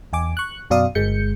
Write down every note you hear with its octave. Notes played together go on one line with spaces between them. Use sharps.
E2 G#5 D6
C#6 F#6
F#2 B2 D5 F5 D#6
G1 G#3 G6 C#7